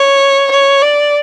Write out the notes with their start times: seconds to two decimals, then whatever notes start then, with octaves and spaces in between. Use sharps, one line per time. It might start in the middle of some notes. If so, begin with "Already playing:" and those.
Already playing: C#5
0.51 C#5
0.82 D5